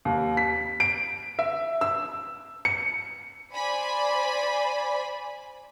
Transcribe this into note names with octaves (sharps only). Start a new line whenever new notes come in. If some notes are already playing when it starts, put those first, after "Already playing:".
D#2
B6
D7
E5
E6
C#7
C5 D5 G#5 B5